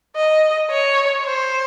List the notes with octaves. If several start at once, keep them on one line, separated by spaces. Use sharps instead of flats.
D#5
C#5
C5